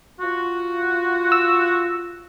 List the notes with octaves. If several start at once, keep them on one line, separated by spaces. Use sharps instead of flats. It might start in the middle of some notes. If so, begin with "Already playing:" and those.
F4 F#4
E6